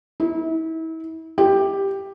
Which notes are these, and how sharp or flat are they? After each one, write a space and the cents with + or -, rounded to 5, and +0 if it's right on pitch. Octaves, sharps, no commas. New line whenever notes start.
E4 -35
G4 +5